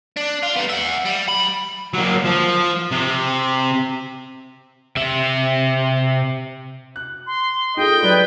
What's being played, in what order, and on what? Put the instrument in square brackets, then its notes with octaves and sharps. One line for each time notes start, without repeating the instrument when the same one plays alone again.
[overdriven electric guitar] D4
F4
G3 B3
E5 F#5
G3
F#3 B5
[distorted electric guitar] F#3 A#3
F3
C3
[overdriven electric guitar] C3 E5
[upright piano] F#6
[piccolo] C6
[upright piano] D#4 F4 A4 [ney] G#4 [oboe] D#5 [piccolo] G5
[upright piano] F#3 [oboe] B4 [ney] D5